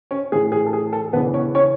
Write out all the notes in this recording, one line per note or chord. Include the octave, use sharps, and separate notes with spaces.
C#4 C#5
A2 E3 G#4
G#4
A4
G#4
A4
E2 C#3 E3 B3 B4
C#4 C#5
C#4 C#5